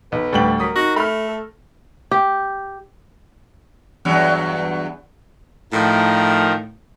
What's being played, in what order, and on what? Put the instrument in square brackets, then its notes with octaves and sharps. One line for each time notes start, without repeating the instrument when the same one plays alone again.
[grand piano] B1 [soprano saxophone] B4
[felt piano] D2 G3 D4 [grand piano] A2 G5 F#7
[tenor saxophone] F#3 [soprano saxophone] A#4 [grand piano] D#6 B6
[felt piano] D#4 [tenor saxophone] F#4 [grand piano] A#6
[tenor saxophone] A3 [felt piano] B5 F6
[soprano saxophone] A4
[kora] G4
[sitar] E2 G2 F#3
[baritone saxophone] A2 [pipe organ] D#3 F3 A#4